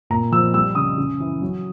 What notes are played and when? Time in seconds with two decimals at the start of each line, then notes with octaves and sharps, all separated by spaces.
0.10 A#2 A#5
0.32 F3 E6
0.54 G3 E6
0.75 C#3 D#6
0.98 C#3
1.20 E3
1.41 F#3